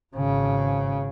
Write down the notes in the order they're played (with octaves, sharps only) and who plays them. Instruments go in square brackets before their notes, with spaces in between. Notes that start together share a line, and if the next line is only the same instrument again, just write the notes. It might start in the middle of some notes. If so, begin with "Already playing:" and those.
[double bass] G#1 C#3